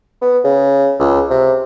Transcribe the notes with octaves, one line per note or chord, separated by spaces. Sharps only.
B3
C#3
C#2
C3